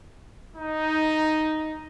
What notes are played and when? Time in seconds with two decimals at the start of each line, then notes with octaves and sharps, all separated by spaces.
0.56 D#4